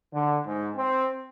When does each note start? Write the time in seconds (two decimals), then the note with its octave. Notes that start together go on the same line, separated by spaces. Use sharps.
0.12 D3
0.45 G#2
0.76 C4